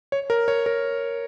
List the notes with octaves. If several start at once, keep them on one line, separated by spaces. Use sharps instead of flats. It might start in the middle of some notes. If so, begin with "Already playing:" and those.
C#5
A#4
C#5
A#4